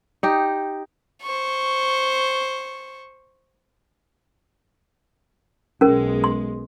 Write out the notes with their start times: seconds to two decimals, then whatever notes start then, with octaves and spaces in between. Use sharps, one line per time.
0.23 D#4 G4
1.22 C5 C#6
5.81 B1 G#3 C#4 A#4
6.24 C6